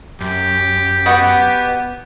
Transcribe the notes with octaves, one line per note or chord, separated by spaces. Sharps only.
F#2 G4
B3 F#4 B4 D#5